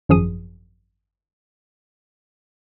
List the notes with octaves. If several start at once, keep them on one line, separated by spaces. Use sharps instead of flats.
G#1 F#2 F3 G#4 D#6 D#7